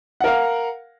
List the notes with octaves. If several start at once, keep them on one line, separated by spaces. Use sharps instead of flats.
A#4 F5 F#5